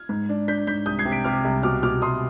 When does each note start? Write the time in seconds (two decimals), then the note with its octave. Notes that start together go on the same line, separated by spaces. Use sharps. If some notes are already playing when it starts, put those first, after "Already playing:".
Already playing: F6 G#6
0.09 G#2
0.29 D4
0.48 D4 G6 B6
0.67 G#2 G6 B6
0.86 C2 D#6 G6
0.99 G#6 C7
1.05 C3
1.12 B6 D7
1.24 C3 D6 F6
1.45 C2
1.63 B2 D6 F6
1.83 B2 D6 F6
2.02 C2 C6 D#6